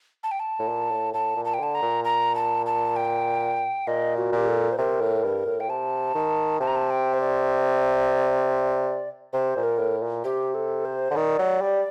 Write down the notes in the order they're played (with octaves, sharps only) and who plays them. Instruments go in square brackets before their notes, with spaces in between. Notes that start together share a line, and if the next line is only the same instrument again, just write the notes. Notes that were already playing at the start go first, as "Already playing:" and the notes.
[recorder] A5
G5
A5
[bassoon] A2
A#2
A2
[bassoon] A2 [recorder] A5
[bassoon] A#2
[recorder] A5
G5
[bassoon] D3 [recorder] A5
[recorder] A#5
[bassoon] A#2
[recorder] A#5
A5
A5
G5
[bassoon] A#2 [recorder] D#5
[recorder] F#4
[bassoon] A#2 [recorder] G4
[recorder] A4
C5
[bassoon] C3 [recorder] A#4
[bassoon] A2
G2
A2
[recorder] G5
[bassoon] C3 [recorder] A5
[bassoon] D#3
[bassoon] C3 [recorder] A5
[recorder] A#5
A5
G5
C5
D5
[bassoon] C3 [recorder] C5
[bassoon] A#2
[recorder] A#4
[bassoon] A2
A#2
[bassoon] C3 [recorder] G4
[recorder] A4
C5
[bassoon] D3
[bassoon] D#3 [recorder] D5
[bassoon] F#3
G3